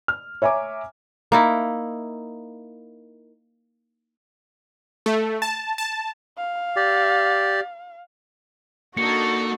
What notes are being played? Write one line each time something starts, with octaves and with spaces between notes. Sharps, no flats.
F6
C#5 E5 G#5 A#5 D6
A#3 D#4 E4
A3
A5
A5
F5
G4 D5
A#3 D4 D#4 F#4 A4 C#7